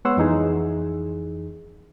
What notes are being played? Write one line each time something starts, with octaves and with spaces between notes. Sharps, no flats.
G#3 B3 C#5 F#5 C6 E6
F2 E3 D#4 G#4